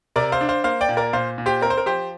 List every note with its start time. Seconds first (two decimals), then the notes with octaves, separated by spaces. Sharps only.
0.16 C3 A#4 D5
0.32 C5 F5
0.41 D4
0.48 C5 F5
0.64 A#3 C5 F5
0.81 D5 G5
0.89 A#2
0.97 A#4 D5
1.13 A#2 C5 F5
1.38 A#2
1.46 G4 C5
1.62 C4 A#4
1.70 C5
1.78 A#4
1.86 F3 G4 C5